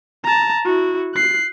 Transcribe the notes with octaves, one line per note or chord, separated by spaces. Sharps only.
A5 A#5
E4 F#4
F#6 C7